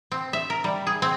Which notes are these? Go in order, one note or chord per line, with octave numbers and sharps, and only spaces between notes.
C4
E5
A#4
G3
G#4
C4